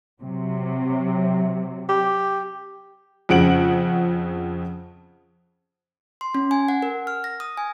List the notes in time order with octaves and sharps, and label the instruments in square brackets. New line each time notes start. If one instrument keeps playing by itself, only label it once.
[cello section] C3 F#3
[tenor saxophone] G4
[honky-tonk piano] F2 C#3 F#5 D7 F#7
[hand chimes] C6
C#4
G#5
F#5
A#4
F6
A#6
D#6
G#5